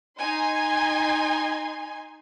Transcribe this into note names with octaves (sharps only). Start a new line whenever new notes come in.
D#4 G#5 C6